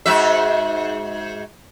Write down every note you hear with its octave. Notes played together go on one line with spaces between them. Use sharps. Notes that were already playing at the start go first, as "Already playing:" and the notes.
G#2 F#4 E5